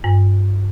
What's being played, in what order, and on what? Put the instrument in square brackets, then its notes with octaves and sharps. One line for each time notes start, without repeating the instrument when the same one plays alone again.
[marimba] G2